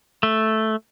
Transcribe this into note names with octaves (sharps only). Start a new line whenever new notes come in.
A3